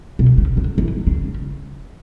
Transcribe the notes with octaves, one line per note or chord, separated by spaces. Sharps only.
B2
C#3
D3
E3
C#3